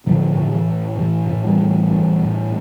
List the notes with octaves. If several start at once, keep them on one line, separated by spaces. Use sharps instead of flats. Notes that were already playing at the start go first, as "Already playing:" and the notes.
A2 D3 F3
A2
E3
A1
A2 E3
A2
E3 G3
A1
A1
A2